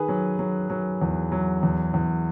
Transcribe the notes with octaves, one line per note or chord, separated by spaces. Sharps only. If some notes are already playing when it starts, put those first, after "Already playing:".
Already playing: D#3 G#4 B4
F#3
F#3
F#3
E2
F#3
E2
E2